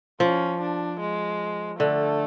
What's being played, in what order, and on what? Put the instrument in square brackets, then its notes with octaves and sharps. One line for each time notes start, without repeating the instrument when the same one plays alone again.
[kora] F3 [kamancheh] C#4
[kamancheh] D4
G#3
[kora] D3 [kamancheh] A3